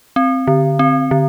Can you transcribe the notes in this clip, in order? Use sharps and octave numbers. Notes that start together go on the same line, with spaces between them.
C4
D3
C4
D3